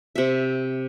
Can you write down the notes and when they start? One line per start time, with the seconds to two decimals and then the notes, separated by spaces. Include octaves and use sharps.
0.16 C3 E5